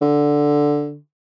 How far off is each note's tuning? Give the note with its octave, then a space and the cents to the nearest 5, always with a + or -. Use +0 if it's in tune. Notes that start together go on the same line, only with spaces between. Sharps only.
D3 +0